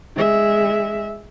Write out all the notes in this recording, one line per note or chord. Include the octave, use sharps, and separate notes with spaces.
G#3 E5